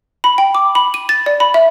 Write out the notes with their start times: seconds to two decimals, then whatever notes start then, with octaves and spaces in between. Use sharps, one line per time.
0.24 B5
0.38 G5
0.55 D6
0.75 B5
0.94 D#7
1.09 A6
1.26 D5
1.40 B5
1.54 E5